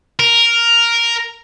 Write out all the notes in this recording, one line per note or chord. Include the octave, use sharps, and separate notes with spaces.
A#4